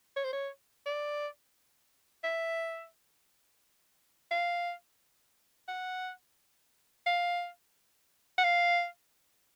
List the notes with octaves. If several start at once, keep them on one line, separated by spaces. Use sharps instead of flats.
C#5
C5
C#5
D5
E5
F5
F#5
F5
F#5
F5